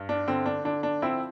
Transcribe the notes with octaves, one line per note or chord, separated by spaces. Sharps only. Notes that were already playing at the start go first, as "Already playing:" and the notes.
Already playing: G2
D4
D3 C4
D4
D3 D4
D4
F3 C4 E4